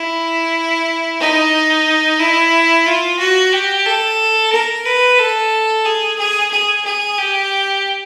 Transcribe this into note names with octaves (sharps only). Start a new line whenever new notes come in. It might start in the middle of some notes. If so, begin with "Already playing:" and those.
Already playing: E4
D#4
E4
F4
F#4
G4
A4
A#4
B4
A4
G#4
G#4
G#4
G#4
G4